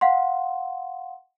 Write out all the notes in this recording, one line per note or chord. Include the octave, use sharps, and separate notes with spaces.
F5 F#5 C6